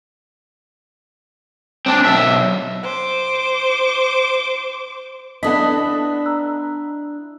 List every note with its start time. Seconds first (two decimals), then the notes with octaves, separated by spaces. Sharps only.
1.86 C4 D4
2.05 B1 E5
2.83 C5 D6
5.43 B3 D4 E4 A4 D#5 D#6 B6
6.26 A#5 E6 F#6